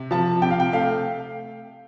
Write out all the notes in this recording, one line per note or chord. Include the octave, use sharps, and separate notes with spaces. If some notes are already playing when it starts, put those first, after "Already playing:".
Already playing: C3
F3 A5
C3 G5
F5
G5
A3 F5